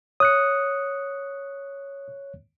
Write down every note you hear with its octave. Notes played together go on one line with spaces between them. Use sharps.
C#5 D#6 F#6 C#7